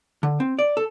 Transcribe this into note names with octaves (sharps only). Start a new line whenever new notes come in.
D3
C4
D5
A4